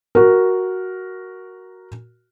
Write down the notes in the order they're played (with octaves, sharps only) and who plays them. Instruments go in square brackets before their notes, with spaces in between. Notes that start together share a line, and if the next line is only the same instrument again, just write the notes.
[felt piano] F#4 A#4